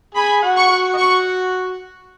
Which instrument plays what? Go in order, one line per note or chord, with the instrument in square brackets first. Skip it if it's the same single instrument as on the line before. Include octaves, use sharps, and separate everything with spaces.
[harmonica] G#4 G#5 [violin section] B5
[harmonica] F#4 F#5
[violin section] C#6
[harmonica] F#4 F#5
D#5
[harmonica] F#4 F#5 [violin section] C#6